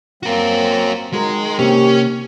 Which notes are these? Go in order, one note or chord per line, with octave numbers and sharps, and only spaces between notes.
F#3 A#3 C4 F#4 A#4
D#3 G#3 F#4 A#4
C3 A#3 C4 C#4 G4